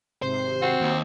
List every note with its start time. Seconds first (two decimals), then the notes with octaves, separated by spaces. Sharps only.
0.22 G#1 C3 C5 C7
0.62 C4 F#4
0.81 D#2